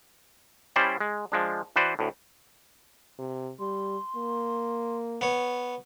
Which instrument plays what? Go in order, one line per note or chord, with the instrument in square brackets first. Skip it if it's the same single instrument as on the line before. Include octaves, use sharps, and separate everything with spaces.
[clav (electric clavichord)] G3 C#4 E4 C5 D5 G5
G#3
F3 G#3 D4
E3 F#4 B4 C5 D5
D2 A2
[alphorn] C3
[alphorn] G3 [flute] C6
[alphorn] A#3
[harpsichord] B3 C#5